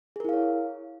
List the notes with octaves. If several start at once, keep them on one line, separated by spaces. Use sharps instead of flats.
E4 G#4 A#4 C#5 F5